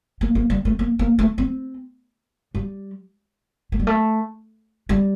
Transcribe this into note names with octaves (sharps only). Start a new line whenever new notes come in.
A#3
A#3
G3
A3
A#3
A#3
A3
C4
G3
A3
G3
A3
G3